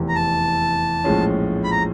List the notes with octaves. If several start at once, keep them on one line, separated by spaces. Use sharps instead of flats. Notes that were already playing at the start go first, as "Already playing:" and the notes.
Already playing: F1 E2 C3 E3
A#5
A5
A#1 A2 F3 G#3 C#4
B5
A#5